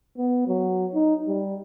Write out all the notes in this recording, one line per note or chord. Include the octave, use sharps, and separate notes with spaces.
B3
F#3
D#4
G3